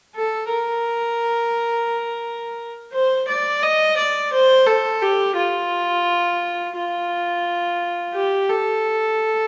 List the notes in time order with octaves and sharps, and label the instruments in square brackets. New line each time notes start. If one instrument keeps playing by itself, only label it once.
[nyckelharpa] A4
A#4
C5
D5
D#5
D5
C5
A4
G4
F4
F4
G4
A4